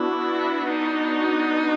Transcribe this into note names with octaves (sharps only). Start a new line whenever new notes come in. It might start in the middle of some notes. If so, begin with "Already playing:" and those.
Already playing: B3 D4 E4 F#4
D#4